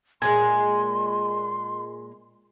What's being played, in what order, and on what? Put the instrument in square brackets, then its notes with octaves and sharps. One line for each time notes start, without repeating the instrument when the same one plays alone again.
[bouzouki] A#2 F#3 G#3 [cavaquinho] G#5 [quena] C6